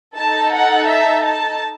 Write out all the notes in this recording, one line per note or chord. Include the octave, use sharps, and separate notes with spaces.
D#4 A4 A5
F#5
E5
A5